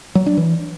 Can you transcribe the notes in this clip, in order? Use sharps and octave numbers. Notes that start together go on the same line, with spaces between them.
F#3
D4
E3